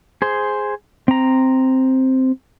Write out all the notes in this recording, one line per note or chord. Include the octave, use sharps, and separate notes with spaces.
G#4 C5
C4 A#5